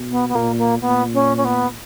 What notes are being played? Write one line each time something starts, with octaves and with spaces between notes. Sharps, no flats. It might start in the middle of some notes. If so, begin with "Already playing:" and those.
Already playing: B2
B3
B3
A#2 A#3
A#3
A#2 B3
C#4
C#4
B3